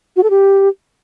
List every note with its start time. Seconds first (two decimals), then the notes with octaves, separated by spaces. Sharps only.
0.16 F#4
0.23 A4
0.30 G4